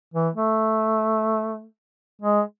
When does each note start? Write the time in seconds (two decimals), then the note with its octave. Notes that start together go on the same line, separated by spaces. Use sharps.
0.14 E3
0.35 A3
2.22 G#3